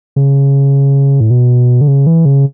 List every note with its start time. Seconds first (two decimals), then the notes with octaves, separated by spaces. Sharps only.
0.16 C#3
1.20 A2
1.30 B2
1.81 D3
1.88 C#3
2.07 E3
2.25 C#3